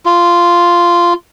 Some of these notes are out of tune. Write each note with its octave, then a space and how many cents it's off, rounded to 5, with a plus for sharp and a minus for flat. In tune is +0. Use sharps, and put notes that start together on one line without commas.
F4 -10